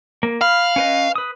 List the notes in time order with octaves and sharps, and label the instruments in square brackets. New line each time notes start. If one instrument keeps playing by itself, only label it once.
[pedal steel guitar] A#3
[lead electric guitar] F5 [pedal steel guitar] B5 F6
[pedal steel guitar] C#4 B4 D#5
B4 D#6